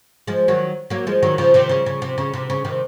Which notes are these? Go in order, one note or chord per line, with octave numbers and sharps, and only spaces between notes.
F3 G#3
D#3 F#3
F#3 A#3
F3 G#3
D#3 F#3
C#3 F3
C3 D#3
C#3
C#3
C3
C#3
C3
C#3
C3 D#3